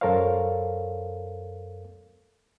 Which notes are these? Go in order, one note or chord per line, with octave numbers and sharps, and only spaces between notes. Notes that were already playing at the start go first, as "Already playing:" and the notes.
F#2 A4 A#4 C5 C#5 F5